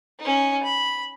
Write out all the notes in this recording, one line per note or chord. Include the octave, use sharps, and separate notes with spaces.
C#4 D#4
B5